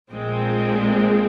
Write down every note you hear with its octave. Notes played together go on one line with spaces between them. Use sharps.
A#1 A#2 G#3 C4